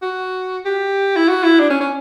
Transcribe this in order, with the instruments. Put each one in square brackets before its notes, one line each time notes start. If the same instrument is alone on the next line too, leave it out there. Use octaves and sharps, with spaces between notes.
[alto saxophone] F#4
G4
E4
F#4
E4
D4
C#4
C#4